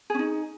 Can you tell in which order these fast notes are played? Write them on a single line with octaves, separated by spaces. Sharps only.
G#4 C#4 D#4